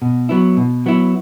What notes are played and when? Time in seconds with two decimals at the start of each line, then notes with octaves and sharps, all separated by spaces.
0.02 B2
0.29 F#3 B3 E4
0.57 B2
0.86 F#3 B3 E4